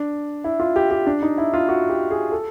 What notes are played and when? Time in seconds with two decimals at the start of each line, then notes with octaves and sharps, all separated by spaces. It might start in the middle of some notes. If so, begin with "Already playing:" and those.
Already playing: D4
0.44 E4
0.60 F4
0.76 G4
0.91 G4
1.07 D4
1.22 D#4
1.38 E4
1.54 F4
1.69 F#4
1.90 G4
2.11 G#4
2.32 A4